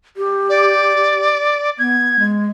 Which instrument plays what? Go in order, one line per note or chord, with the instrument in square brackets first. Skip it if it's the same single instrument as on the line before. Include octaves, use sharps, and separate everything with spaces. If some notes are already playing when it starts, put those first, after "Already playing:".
[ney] G4
[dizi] D5
[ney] B3 [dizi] G#6
[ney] G#3